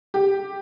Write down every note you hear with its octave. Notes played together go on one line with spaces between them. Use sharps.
G4